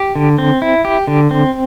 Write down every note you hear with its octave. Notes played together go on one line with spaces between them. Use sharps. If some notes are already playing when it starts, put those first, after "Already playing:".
Already playing: G4
D3
C4
E4
G4
D3
C4